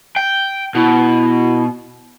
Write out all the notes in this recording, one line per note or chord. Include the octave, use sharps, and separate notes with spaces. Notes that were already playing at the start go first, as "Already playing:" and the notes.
G5
B2 E4